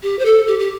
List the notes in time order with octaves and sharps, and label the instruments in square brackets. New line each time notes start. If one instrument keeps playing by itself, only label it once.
[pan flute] G4
C5
A4
G4
G4